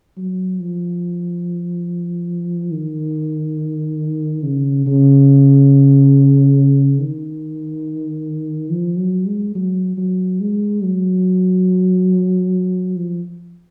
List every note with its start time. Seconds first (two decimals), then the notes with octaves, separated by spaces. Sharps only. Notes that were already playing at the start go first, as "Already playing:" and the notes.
0.17 F#3
0.60 F3
2.72 D#3
4.43 C#3
4.86 C#3
6.99 D#3
8.70 F3
8.98 F#3
9.27 G#3
9.55 F#3
9.97 F#3
10.40 G#3
10.83 F#3
12.96 F3